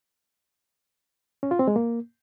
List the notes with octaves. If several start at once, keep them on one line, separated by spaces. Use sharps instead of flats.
C#4
F4
C4
G#3
A#3